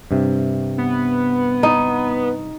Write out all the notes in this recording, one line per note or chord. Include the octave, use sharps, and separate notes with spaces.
G2 C3
B3
D#4